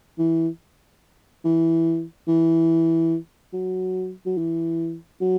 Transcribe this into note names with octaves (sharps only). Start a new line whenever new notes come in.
E3
E3
E3
F#3
F#3
E3
F#3